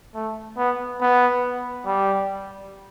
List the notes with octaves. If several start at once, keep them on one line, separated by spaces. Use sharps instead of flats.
A3
B3
B3
G3